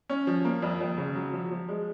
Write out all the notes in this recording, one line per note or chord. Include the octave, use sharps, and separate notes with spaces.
C#4
F3
A#3
F2
F2
C#3
F#3
F3
F3
G#3